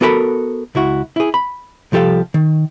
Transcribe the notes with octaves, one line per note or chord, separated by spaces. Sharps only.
B3 F#4 A4 A#4 G#5 B5
C#2 E4 F#4
E4 G#4
B5
C2 F3 G4 A4 F5
D#3